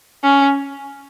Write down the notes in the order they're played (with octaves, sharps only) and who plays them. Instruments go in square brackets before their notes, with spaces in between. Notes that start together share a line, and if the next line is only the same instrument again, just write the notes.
[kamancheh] C#4